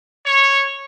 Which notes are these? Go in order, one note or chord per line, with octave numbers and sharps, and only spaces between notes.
C#5